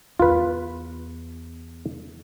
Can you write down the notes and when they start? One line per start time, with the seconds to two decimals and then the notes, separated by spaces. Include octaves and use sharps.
0.19 E2 F4 B4